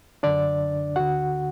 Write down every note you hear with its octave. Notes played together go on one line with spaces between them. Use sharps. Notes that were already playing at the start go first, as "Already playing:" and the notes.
F#2 D3 D4 D5
D2 D3 F#4 F#5